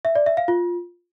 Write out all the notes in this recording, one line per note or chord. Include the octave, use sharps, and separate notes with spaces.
E5
D5
E5
F5
F4